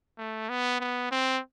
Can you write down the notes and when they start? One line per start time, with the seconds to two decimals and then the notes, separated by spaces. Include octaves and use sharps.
0.18 A3
0.50 B3
0.80 B3
1.11 C4